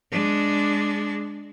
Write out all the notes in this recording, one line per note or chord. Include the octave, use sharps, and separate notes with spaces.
G#3 D4